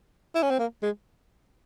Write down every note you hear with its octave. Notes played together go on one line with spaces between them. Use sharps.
E4
C#4
C4
A#3
G#3